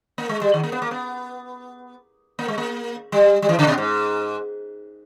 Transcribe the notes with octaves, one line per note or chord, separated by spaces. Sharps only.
A#3
G#3
G3
D#3
A#3
B3
A#3
B3
A#3
G#3
A#3
G3
G3
E3
C#3
B2
G#2